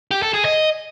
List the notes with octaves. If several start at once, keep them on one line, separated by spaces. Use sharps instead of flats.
G4
A4
G#4
D#5